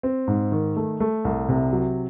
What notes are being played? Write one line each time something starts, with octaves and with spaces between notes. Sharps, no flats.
C4
G#2
D#3
A3
A3
C2
C3
F#3